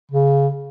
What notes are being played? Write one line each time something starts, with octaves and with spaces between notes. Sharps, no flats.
C#3